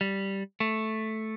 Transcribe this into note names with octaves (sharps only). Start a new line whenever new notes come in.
G3
A3